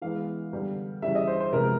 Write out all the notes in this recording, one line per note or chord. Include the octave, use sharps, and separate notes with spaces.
E3 G#3 B3 F5
D3 G3 B3
C#3 E3 G3 E5
D#5
C5
C5
C3 F3 G#3 B3 A#4